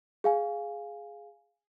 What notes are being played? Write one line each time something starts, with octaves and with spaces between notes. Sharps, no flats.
G#4 F5 G#5